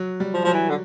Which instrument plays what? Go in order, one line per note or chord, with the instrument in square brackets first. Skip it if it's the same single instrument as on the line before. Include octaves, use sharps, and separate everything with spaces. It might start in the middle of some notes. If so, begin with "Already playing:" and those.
Already playing: [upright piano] F#3
G3
[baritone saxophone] F3
[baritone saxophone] F3 [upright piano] F#3
[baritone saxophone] E3
D3